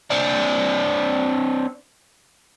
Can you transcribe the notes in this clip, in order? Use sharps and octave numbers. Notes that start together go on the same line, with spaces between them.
C4 D4